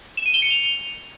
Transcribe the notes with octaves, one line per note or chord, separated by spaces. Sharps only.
E7
D#7
G7
C#7
F7